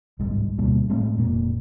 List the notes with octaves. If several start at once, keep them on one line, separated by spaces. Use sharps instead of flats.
D1 C2 G#2
D2 B2 G3 A#3
A2 G#3 A3 C4
F1 A#2 A#3